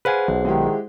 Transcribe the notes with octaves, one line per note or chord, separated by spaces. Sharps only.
G#4 B4 C5 F5 F#5 G#5
B1
D#3 G#3 E4 G4